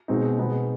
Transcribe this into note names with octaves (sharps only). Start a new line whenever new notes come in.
B2 G#3 C4 D#4
B2 G#3 B3 D#4